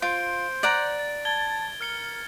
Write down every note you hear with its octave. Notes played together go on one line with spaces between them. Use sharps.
F4 C5 D7
D5 F#5 A#5 A6
A6
A5 G#6 A6 G7
A#4 F6 C#7 G7